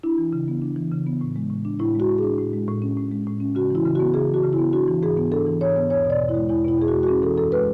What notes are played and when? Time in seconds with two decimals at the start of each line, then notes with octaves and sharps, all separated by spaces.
0.03 D4 E4
0.18 E3
0.33 C#3
0.48 B3
0.62 D4
0.76 E3
0.92 C#3
1.07 B3
1.21 A2
1.36 G#3
1.50 A2
1.65 D4
1.79 A2 E4
1.95 G#3 F#4
2.09 A2
2.18 D4 G#4
2.38 A2
2.53 G#3
2.68 A2
2.82 C#4
2.97 A2
3.12 G#3
3.27 A2
3.40 C#4
3.55 C#3 F#4
3.70 E3 E4
3.85 C#3
3.95 B3 F#4
4.14 C#3 G#4
4.29 E3 F#4
4.43 C#3
4.53 E4
4.59 B3
4.73 D4 F#4
4.88 E3
5.03 G#2 G#4
5.17 B3
5.31 D4 A4
5.46 E3
5.61 G#2 C#5
5.76 B3
5.90 E2 C#5
6.05 B2
6.10 D5
6.20 E2
6.29 E4
6.35 G#3
6.49 E2 E4
6.64 B2 E4
6.78 E2 G#4
6.88 F#4
6.93 G#3
7.03 F#4
7.07 C#4 G#4
7.22 E3 A4
7.37 F#2 A4
7.52 G#3 B4